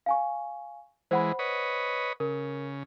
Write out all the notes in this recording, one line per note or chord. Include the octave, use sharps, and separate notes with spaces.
F5 G#5 C#6
E3 G#3 C5 F#5 B5
B4 C#5 D#5
C#3 A#4